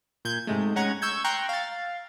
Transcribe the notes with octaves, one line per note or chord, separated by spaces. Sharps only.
A#2 G6 G#6
G#2 C3 G#3 A3
G#3 C#4 F#5 A#5 G#6
C#6 E6 G6 G#6
G5 A#5 C6 C#6 F#6 G6
F5 A6